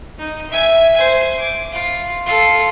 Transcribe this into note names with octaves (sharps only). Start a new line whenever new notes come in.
D#4
E5 G#5
C5 G#5
D6
F4
F4 A4